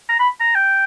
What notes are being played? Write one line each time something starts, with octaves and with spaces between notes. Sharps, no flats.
A#5
B5
A#5
G5